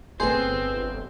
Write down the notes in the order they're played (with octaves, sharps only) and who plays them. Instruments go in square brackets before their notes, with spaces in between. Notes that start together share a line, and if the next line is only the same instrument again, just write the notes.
[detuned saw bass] G1 [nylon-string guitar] B3 G#4 [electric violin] C4 [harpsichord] C5